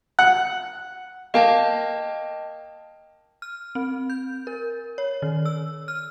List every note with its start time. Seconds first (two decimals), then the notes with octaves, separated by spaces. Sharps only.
0.19 F#5
1.34 A#3 D#5 G5 A5
3.42 F6
3.75 C4
4.10 G6
4.47 A#4
4.98 C#5
5.22 D#3
5.46 E6
5.88 F6